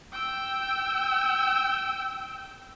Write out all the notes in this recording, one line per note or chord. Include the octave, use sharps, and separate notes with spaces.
G5 E6